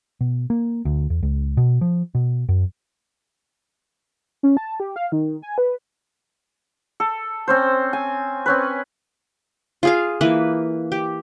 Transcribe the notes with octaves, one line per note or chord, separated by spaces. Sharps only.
B2
A#3
D2
E2
C#2
B2
F3
B2
F#2
C#4
A5
G4
F5
D#3
G#5
B4
A4
C4 C#4 C5
G#5
C4 C#4 B4
F4 G#4 F5
E3 A#3 B4
G4